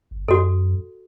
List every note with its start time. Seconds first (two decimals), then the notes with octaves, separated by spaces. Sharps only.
0.11 G1
0.28 F#2 F#4 A4